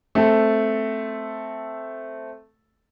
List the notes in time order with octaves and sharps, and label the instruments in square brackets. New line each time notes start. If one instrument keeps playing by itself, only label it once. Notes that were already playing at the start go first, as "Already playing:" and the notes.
[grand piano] A3 C4 A4